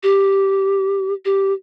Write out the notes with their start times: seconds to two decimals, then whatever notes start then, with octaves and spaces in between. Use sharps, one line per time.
0.03 G4
1.25 G4